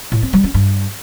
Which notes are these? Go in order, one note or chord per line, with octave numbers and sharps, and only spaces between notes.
A2
C4
G3
C#4
G2